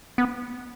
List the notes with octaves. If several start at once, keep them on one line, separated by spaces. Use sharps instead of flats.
B3